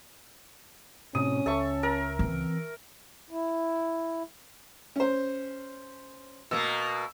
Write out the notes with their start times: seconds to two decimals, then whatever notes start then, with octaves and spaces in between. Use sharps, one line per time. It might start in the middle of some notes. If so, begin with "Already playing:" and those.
1.15 A2 C3 C#4 D#6
1.46 C#2 A4 E5 C#6
1.83 A#4
2.19 E3 C4
3.30 E4
4.96 C#4 C5
6.51 B2 A#3 E6